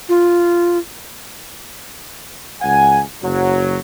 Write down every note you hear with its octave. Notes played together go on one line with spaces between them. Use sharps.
F4
C#2 F#5 G#5
F#1 F#3